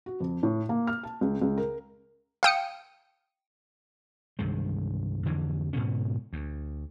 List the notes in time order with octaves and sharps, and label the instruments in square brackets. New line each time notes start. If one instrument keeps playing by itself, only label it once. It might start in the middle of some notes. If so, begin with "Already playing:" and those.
[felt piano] F#4
F2
A2
A#3
F6
A5
C#2
C#2
A#4
[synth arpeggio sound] F5 G5 D#6 C#7
[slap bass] C2 G2 D#3 G#3
F2 D3 E3
G#2 B2 D3 C#4
D2